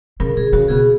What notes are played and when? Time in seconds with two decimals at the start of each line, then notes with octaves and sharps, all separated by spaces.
0.20 C#3 A#4
0.37 C#3 G#4
0.53 C#3 F#4
0.69 B2 G#4